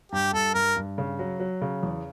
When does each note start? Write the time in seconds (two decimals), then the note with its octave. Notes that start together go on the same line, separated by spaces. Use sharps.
0.12 G2 G4
0.33 G2 A4
0.54 G2 A#4
0.76 G2
0.98 C#3
1.19 F#3
1.40 F#3
1.62 C#3
1.83 E2